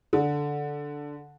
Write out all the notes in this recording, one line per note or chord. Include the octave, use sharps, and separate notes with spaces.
D3